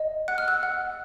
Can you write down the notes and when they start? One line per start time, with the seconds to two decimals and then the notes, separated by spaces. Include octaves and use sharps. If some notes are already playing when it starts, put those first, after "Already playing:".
Already playing: D#5
0.28 F#5 F#6
0.38 F6
0.48 E6 F#6
0.63 F#5